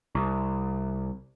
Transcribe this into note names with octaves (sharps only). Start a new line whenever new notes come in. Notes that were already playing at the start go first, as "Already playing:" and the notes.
C2